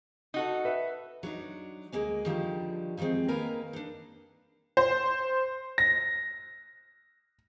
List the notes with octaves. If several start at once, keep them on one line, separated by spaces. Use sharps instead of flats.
D#4 F#4 A4
B4 E5
F#3 D4 D#4
D2 G#3 A#3 G#5
D3 D#3 F3 G3
D#3 F3 F#3 G#3 C4
D#3 A#3 A#4 B4 G#5 A#5
D4 D#4
C5
A#6